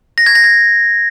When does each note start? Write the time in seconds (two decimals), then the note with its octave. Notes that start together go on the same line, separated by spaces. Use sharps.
0.18 A#6
0.26 G#6
0.35 A#6
0.44 G#6